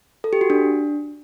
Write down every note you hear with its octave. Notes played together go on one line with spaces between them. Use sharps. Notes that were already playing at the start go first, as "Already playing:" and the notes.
A4
G4
F#4
D4